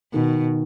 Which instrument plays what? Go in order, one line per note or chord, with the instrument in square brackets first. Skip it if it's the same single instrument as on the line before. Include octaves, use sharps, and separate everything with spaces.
[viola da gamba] B2 [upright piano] D#3